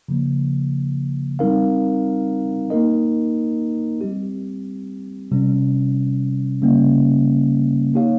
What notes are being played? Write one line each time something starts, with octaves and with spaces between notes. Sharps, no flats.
C#3 F3 A#3
G3 C4 D#4 A#4 F5
A#3 D#4 A#4 D#5
G3 C4 G4
C3 G3 C#4
C#3 G3 A#3 C#4
A#3 D#4 G4 C#5 F5